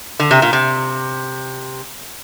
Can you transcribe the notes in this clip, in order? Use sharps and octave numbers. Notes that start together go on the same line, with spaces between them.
D3
C3
A#2
C3